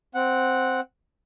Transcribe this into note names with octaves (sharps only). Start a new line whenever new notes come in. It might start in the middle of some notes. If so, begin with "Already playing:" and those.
C4 F#5